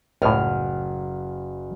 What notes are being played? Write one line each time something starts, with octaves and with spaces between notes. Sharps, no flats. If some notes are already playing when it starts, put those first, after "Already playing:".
F#1 C#2 A2 F6